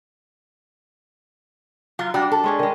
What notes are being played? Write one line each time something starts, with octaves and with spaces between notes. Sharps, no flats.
F#3 F4
G3 D4 F#4
A4
G#3 C#4 G#4
D#3 G#3